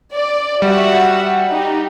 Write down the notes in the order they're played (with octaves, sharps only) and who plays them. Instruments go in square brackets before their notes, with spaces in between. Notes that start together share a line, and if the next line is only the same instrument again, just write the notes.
[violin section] D5
[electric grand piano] G3 [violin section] F#4 E5 F#5
[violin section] D#4 G4